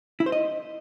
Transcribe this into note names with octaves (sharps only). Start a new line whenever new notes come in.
E4
C5
D#5